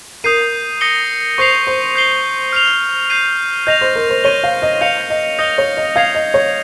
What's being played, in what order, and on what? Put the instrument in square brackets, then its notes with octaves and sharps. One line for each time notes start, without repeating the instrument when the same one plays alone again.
[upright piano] A#4 [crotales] D#6 G6 C7 D#7
[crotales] D#6 A#6 C#7 G7
[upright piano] C5 [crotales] C#6 G6 C7 F7
[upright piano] C5
[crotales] G6 C7 G7
F6 C7 F7
G6 C7 D#7
[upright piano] D#5 [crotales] G6 A#6 F7
[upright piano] C5
A#4
C5
[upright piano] C#5 [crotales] G6 A#6 D#7 G7
[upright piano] F5
D#5
[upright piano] F5 [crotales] G6 C#7 F7
[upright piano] D#5
[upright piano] D#5 [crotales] D#6 G6 A#6 C#7 G7
[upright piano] C#5
D#5
[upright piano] F5 [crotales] D#6 G#6 C7 F7
[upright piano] D#5
C#5